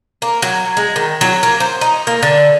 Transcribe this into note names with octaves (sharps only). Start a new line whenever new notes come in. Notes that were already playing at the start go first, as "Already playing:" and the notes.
A#3
F#3
G#3
D#3
F#3
A#3
C5
D#4
A#3
D3